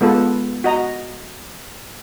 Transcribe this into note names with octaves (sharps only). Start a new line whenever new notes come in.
G#3 B3 F4 A4 B4
F#4 D#5 A#5